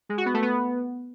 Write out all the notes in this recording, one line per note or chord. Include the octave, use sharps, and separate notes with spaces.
G#3
F#4
B3
A3
B3